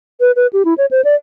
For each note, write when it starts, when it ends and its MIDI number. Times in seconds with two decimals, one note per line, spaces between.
0.20 0.32 71
0.36 0.47 71
0.53 0.65 67
0.65 0.74 64
0.78 0.86 73
0.91 1.01 72
1.04 1.15 74